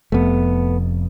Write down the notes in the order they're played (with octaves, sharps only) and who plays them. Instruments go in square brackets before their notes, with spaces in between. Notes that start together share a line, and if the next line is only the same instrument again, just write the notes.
[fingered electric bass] F1 F2 [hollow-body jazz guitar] A3 B3